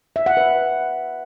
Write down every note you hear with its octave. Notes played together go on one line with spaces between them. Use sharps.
E5
F#5
B4